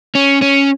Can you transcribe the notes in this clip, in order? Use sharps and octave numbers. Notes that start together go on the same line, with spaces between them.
C#4
C#4